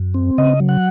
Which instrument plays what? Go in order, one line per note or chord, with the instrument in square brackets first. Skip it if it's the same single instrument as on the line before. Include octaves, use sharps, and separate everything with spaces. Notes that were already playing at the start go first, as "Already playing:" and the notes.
Already playing: [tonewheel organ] F#2
C4
C#3 D#5
F#3
F#5